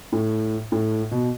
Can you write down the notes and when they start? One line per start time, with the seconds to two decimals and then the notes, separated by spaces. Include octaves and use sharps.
0.12 A2
0.72 A2
1.11 B2